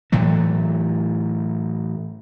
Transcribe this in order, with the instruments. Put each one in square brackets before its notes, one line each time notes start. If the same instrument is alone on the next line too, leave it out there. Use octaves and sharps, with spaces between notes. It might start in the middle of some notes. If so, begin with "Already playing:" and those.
[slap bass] A2 E3 F#3 A3